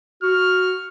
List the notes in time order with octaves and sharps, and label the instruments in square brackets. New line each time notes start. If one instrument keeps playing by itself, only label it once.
[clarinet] F#4 [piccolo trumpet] F6